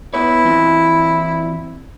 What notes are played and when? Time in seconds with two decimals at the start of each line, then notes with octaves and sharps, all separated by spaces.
0.14 B3 E4 B4 C#5
0.45 E3 C4